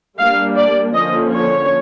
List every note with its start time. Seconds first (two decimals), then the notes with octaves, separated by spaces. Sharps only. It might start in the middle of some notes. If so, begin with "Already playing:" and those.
0.18 G3 A#3 D4 F5
0.56 D5
0.94 D3 F3 A#3 C#4 D#5
1.34 C#5